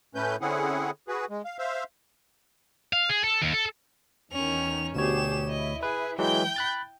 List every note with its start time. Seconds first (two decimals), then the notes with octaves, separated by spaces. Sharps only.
0.15 A2 A3 C#4 B4 G6
0.41 D3 C4 C#4 E4 G#4 F#5
1.08 F#4 G#4 B4
1.30 G#3
1.45 F5
1.59 C5 E5 F5
2.93 F5
3.09 G#4
3.24 A4
3.42 D#2
3.54 A4
4.32 E2 D#3 C#4 F7
4.96 D2 B2 G4 G#4 C#5 E7
5.49 E4 D#5
5.83 G#4 B4
6.19 E3 F#3 G#3 G5 G6
6.56 B5 F#6 A6